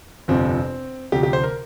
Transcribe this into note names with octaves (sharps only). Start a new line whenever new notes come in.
G1 F2 C3 F3 C4
D2 C3 F3 G4
G4
C5
A#4